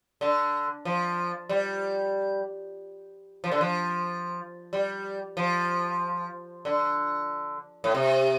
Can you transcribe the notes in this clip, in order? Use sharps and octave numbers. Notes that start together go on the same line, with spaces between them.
D3
F3
G3
F3
D3
F3
G3
F3
D3
A2
C3